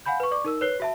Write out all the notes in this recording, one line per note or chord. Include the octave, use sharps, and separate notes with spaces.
F5 F#5 G#5 B5 G6
B4 C#6
D5 C#6 D6
D#4 A#4 E6
B4 C#5 F#6 C7 G7
F#4 E5 A5